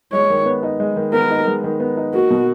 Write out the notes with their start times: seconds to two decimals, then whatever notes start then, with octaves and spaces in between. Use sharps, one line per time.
0.13 G#3 C#5
0.30 D#3
0.46 B3
0.63 D#4
0.80 G#3
0.96 D#3
1.13 B3 A#4
1.30 D#4
1.47 G#3
1.64 D#3
1.80 B3
1.97 D#4
2.14 A#3 F#4
2.30 B2